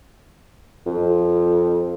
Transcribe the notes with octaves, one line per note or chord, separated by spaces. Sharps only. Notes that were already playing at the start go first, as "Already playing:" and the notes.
F2